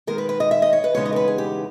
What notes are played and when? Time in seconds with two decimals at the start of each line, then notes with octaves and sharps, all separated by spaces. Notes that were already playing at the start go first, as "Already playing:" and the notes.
0.07 D#3 G#3 B3 A#4
0.18 B4
0.29 B4
0.40 D#5
0.51 E5
0.62 D#5
0.73 C#5
0.84 B4
0.95 E2 C#3 G#3 B3 D#4 C#5
1.05 D#5
1.12 A#4
1.16 B4
1.28 G#4
1.38 G4